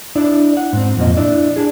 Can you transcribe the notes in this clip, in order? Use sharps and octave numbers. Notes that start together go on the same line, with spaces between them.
D4 E4 D5
F#5
G#2 C4
F2 A#2 D#5
D4 E4 D5
D4 G#4